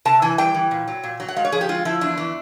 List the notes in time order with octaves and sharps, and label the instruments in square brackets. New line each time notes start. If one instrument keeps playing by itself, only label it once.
[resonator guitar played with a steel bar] C3 A5
E3 G#5
G3 G5
E3
A#2
F#3
A#2
F#3
F#5
G#3 F5
C#5
F3 G#4
G4
G#3 F4
F3 E4
E2 D4
E3